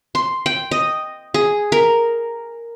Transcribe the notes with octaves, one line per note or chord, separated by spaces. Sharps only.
C6
G5
D#5
G#4
A#4